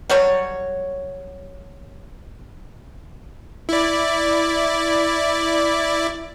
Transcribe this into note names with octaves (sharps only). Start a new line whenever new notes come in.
F#3 G3 C#5
E4 D5